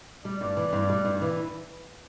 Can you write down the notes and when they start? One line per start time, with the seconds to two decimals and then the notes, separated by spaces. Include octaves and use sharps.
0.24 G3 D5
0.41 G2
0.57 E3
0.73 G2
0.90 G3
1.05 G2
1.22 E3